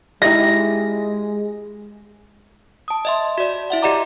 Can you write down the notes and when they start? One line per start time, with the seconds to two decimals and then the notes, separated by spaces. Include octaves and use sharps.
0.22 G#3 D#4 E4 G4 D#5 E5 A#6
2.88 A5 D#6
3.05 D#5 E5 C6
3.38 F#4 D5
3.70 E4 E5 F#5
3.82 G4 D5 D#5 F#5 A#5 D6